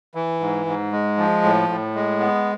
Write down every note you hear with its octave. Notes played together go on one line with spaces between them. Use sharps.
E3
G#2
G#2
G#3
F3
A2
A2
G#3
B3